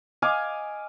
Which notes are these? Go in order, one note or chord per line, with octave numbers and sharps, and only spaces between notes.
D#5 F5 G#5 D6